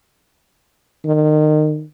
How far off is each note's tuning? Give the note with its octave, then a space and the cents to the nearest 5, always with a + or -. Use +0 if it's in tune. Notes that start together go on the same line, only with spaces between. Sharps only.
D#3 -30